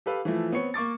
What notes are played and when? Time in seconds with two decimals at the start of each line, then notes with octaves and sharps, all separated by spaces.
0.06 G4 A4 B4 F5
0.25 E3 F3 A3
0.52 B3 C4 C#5 C#7
0.74 A#3 C#6 D6 A6